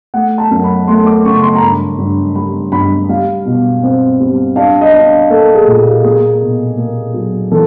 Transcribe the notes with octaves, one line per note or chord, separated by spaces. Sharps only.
A3 F#5
A5
F#2
B5
A3 C6
D6
C#3 C#6
C6
A#5
G2 B5
G2
G3 B5
G2 B5
G3 F5
B2
C4
G3
D4 F5
D#5
D4
A#3 A4
G#4
A#2
G4
A#3 G#4
B2
A#3
F#3
E3 A4